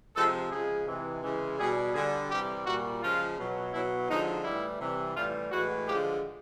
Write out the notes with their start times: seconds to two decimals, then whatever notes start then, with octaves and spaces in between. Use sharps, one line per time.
0.16 C3 F3 G#3 A4
0.51 C#3 F3 G#3 G#4
0.87 C3 E3 G#3
1.23 C#3 E3 G#3
1.58 B2 G3 G#4
1.94 D3 G3 G#4
2.30 C3 E3 G3 G4
2.65 A#2 G3 F#4
3.01 C#3 F3 G#3 F4
3.37 B2 F#3
3.73 B2 F#3 E4
4.08 D3 F3 G#3 D#4
4.44 A2 E3 G3 E4
4.79 C3 E3 G3
5.15 A2 E3 G3 F4
5.51 A2 E3 G#3 F#4
5.87 D3 F3 G#3 G4